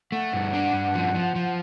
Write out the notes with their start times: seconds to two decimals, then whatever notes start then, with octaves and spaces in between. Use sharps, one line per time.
0.12 A3 F#5
0.33 G2
0.53 D4
0.73 G2
0.95 F3
1.15 F3
1.36 F3